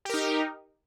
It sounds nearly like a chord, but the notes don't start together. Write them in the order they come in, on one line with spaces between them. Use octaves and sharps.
G4 A#4 D#4